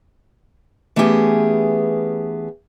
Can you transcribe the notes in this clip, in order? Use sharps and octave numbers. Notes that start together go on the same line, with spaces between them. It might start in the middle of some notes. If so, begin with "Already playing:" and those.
E3 A3 B3 C#4 G4 G#4